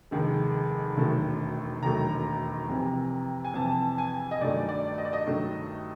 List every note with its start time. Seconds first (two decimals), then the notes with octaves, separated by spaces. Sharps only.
0.11 F1 D#2 D#3 G#3
0.97 E1 D#2 D#3 F#3 A3
1.83 E1 D#2 D#3 F#3 A3 A#5
2.69 F2 C3 E3
3.45 G#5
3.54 F2 C3 E3 A5
3.98 G#5
4.31 D#5
4.41 G2 D#3 F#3 A3 D5
4.69 D5
4.98 D#5
5.05 D5
5.13 D#5
5.26 G2 D#3 F#3 A3